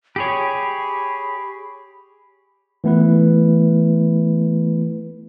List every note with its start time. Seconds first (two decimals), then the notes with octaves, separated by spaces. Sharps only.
0.16 G4 G#4 C#5 B5
2.84 E3 A3 B3 E4 B4